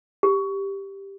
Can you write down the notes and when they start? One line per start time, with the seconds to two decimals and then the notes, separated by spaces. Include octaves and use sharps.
0.23 G4